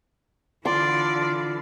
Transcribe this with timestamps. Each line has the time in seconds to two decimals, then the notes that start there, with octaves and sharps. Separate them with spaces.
0.65 D3 E3 F4 D5 C6